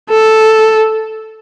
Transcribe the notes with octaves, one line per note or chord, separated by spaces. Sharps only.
A4